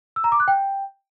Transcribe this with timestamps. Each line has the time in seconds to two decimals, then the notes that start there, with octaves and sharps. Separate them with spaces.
0.16 E6
0.24 A#5
0.32 D6
0.40 F#6
0.48 G5